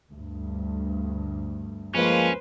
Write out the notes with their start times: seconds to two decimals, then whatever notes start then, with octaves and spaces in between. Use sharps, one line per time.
0.11 D2 G2
1.95 F3 G#3 A#3 C#4 B4 C5